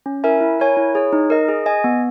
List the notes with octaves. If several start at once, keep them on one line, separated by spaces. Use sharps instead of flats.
C#4
E4 A#4 E5 G#5
E4
A#4 C#5 G#5
E4
G#4 C#5
D#4
A#4 D#5
G#4
D#5 G#5
B3